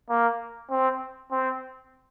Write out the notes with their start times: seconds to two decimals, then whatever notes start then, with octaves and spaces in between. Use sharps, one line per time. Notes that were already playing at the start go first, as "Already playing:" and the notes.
0.09 A#3
0.71 C4
1.32 C4